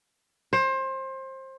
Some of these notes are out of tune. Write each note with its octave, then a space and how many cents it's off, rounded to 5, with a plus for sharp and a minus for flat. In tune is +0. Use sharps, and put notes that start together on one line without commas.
C5 +25